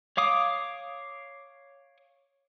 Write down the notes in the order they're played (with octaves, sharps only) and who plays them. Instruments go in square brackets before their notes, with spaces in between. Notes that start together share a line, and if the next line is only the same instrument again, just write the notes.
[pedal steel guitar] C#5 F5 D6 D#6